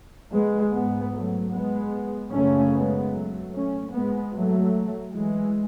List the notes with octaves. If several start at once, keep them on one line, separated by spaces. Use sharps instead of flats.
G#3 B3
G#2 G#3 B3
F#3 A3
G#3 B3
F#2 C#3 A3 C#4
G#3 B3
F#3 A3
A3 C#4
G#2 G#3 B3
F#3 A3
E3 G#3